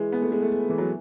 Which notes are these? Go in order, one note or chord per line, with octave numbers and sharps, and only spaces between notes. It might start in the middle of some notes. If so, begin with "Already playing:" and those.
Already playing: E3 G#3
B3
A3
G#3
A3
E3
F#3